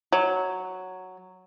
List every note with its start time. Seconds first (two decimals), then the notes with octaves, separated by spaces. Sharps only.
0.12 F#3